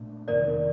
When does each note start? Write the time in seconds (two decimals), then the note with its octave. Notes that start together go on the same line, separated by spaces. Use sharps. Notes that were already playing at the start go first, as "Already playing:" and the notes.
Already playing: A#2 A3 D4
0.28 F2 C3 D#3 A#3 A#4 D5